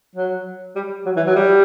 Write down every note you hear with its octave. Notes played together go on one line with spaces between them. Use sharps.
F#3
G3
F#3
E3
F#3
G3